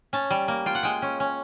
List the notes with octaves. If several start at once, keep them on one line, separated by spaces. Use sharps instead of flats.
C#4 A5
G3
A#3
F4 G5
F#5
G#3 G5
C#4
C#4